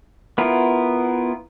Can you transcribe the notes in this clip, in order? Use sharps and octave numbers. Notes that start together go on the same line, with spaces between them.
B3 E4 F4 A#4